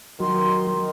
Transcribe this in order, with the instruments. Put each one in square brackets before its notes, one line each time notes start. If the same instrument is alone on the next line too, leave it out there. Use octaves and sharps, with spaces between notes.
[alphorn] D#3 [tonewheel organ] F#3 [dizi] C6